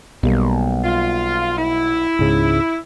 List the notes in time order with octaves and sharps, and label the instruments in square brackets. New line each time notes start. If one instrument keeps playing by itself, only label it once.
[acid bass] B1 [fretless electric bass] B2 G3 A#3
[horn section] F4
E4
[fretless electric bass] C#2 G#2 C#3